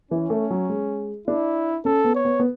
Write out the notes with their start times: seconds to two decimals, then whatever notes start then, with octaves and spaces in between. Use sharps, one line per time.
0.11 E3 C#4
0.30 A3
0.51 F#3
0.69 G#3
1.28 D4 E4
1.85 C#4 A4
2.04 B3
2.15 C#5
2.25 B3
2.40 B3